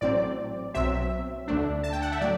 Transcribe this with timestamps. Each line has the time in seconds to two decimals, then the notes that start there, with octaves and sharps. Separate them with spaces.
0.01 A1 A2 F#3 C4 D5
0.74 B1 B2 F#3 C4 E5
1.48 D2 D3 A3 D4
1.83 A5
1.93 G5
2.02 F#5
2.12 E5
2.21 A2 F#3 D5